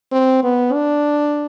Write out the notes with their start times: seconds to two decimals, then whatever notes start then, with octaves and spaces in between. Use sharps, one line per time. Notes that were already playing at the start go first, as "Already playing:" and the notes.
0.12 C4
0.43 B3
0.73 D4